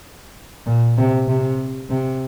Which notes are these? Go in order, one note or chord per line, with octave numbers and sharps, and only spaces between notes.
A#2
C3
C3
C3